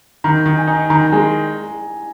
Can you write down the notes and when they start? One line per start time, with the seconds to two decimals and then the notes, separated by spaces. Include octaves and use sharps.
0.24 D#3 A#5
0.46 D#3
0.57 G#5
0.67 D#4
0.90 D#3 A#5
1.01 G#5
1.12 G#3 A#5